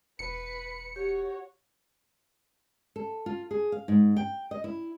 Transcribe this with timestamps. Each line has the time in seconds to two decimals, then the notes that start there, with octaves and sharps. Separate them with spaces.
0.19 E1 B4 B5 C#7
0.96 F#4 G4 C#5
2.96 A4
3.26 F4
3.51 G#4
3.72 F5
3.88 G#2
4.16 G5
4.51 D#5
4.64 E4